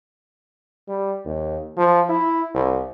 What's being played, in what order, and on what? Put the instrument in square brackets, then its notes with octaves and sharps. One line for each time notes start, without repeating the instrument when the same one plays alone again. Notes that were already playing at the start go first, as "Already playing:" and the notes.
[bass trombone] G3
D#2
F3
E4
C2